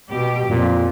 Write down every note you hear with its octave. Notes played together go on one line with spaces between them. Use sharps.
B2 G4
F2 A#2 F3